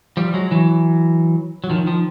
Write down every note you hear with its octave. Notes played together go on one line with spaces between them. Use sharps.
F3 G3
F#3 G#3
E3 F#3
F#3
D#3 F3
D#3 F3